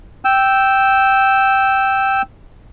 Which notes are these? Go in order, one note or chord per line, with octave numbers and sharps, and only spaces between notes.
G5 E6